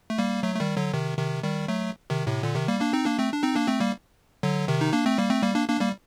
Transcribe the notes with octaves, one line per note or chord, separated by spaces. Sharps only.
A3
G3 A#3
F#3 A3
A3
D#3 G3
D3 F#3
C3 D#3
C3 D#3
D#3 G3
F#3 A3
C3 D#3
A2 C3
A#2 D3
C3 D#3
G3 A#3
A#3 D4
C4 D#4
A#3 D4
A3 C4
D4
C4 D#4
A#3 D4
A3 C4
G3 A#3
D3 F#3
C3 D#3
D#4
A#3 D4
A3 C4
G3 A#3
A3 C4
G3 A#3
A#3 D4
A#3 D4
G3 A#3